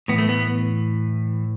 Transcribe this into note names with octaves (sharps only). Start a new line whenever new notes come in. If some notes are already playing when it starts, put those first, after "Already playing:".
A2 E3 B3
A3
B3